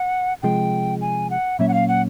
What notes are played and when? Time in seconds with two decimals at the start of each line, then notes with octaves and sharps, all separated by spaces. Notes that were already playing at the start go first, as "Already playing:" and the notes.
Already playing: F#5
0.42 C3 F3 G#3 G5
1.01 G#5
1.30 F#5
1.59 A#2 F#3 A#3 C#4 E5
1.68 F#5
1.74 F5
1.88 F#5